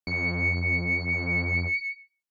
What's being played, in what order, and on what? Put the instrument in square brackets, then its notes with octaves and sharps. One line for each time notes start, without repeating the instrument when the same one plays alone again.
[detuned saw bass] F2 [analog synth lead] C#7